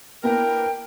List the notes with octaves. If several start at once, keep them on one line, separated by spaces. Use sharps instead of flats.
A#3 B3 D4 E4 A#4 G5